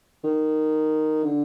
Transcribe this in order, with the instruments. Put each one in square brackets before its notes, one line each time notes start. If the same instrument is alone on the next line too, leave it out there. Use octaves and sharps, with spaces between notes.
[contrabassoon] D#3
D3